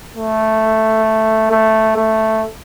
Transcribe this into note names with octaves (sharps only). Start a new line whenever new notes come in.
A3
A3
A3